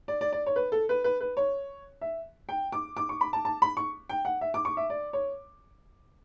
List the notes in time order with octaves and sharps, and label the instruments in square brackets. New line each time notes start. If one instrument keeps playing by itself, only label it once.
[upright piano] D5
D5
D5
C#5
B4
A4
B4
B4
B4
C#5
E5
G5
D6
D6
C#6
B5
A5
A5
B5
C#6
G5
F#5
E5
D6
C#6
E5
D5
C#5